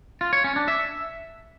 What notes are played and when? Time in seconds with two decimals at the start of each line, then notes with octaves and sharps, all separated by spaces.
0.21 F4
0.33 C#5
0.44 C#4
0.56 D4
0.68 E5